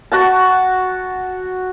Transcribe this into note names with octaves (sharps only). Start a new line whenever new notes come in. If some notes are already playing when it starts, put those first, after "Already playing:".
F#4 F#5 A5